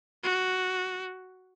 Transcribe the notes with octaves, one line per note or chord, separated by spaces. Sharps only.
F#4